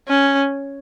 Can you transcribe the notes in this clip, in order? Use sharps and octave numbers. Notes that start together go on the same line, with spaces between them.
C#4